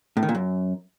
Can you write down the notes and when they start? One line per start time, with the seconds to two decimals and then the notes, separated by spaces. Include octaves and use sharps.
0.17 A2
0.23 D#3
0.29 A#2
0.35 F#2